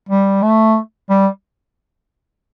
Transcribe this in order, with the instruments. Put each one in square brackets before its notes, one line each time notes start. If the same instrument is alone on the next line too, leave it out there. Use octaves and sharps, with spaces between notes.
[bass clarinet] G3
A3
G3